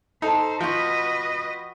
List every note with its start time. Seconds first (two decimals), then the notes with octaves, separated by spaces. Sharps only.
0.22 D#4 A4 C5
0.61 F3 F#4 B4 D#5 G5